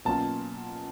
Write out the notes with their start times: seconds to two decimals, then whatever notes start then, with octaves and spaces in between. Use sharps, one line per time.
0.05 B2 F#3 A#3 C#4 F4 A5